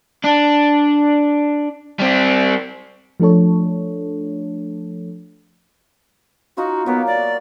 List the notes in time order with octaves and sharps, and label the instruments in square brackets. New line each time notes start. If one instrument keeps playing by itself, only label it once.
[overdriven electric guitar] D4
G3 C4
[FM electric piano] F3 A3 D4 A4 C#5
[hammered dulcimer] D#4 F4 C#6 [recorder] F#4
[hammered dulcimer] F#3 A#3 D6 [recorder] B3
[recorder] D5